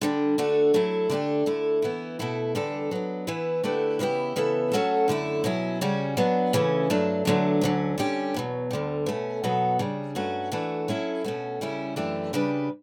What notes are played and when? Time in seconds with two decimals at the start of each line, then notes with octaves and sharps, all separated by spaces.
0.01 D3 G3 D4
0.38 D3 A3 D4 F#4
0.74 F#3 A3 E4
1.10 D3 A3 D4 G4
1.46 D3 A3 E4
1.82 E3 B3 E4
2.19 B2 A3 E4 A4
2.55 E2 D3 G3 D4 A4
2.91 F#3 B3 D4
3.27 E3 B3 E4 B4
3.64 D3 A3 E4 G4 B4
3.99 C#3 E3 B3 E4 G4
4.36 C#3 E3 B3 E4 A4
4.72 F#3 A3 C#4 F#4 A4
5.08 F#2 D3 A3 E4
5.44 B2 F#3 C#4 E4
5.81 C#3 G3 C#4 F#4
6.17 F#3 B3 D4
6.53 C#3 E3 A3 C#4
6.90 G2 F#3 A3 D4
7.25 E2 D3 F#3 A3 D4
7.61 D2 D3 F#3 C#4
7.98 D3 G3 C#4 G4
8.34 E2 B2 F#3
8.71 D2 D3 G3
9.06 B2 A3 C#4
9.44 B2 F#3 B3 F#4 A4
9.79 C#3 G3 D4
10.15 G2 F#3 A3 C#4 F#4
10.52 E3 A3 D4 F#4 A4
10.88 F#3 C#4 E4 A4
11.24 B2 A3 C#4 F#4
11.61 C#3 G3 C#4 E4
11.96 F#2 E3 A3 D4 G4
12.33 C#3 G3 D4 G4 B4